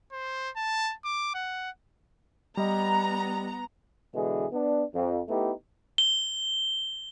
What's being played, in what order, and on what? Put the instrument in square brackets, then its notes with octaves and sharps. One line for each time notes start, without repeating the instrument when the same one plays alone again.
[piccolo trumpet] C5
A5
D6
F#5
[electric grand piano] G3 D#5 [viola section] B3 A#5
[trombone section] B2 D3 E3 G#3 G#4
B3 D4
F2
A3 B3 D#4 E4 G4
[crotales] G7